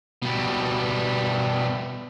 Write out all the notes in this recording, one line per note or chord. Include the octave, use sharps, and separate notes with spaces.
B2 G3